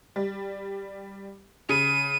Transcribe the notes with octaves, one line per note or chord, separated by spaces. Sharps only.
G3
C#3 D#7